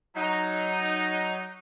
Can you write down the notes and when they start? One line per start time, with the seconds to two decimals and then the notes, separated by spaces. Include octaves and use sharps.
0.15 F#3 D#4